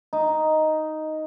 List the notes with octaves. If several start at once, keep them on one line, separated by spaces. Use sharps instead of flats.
D#4